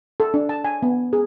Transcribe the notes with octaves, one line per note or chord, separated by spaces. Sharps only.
A4
D4
A5
G#5
B3
G#4